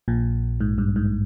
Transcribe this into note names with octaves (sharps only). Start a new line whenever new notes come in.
A#1 A#2
G#2
G2
G#2